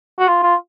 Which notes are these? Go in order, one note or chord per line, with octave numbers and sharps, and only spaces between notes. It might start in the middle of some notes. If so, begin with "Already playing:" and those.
F#4
F4
F4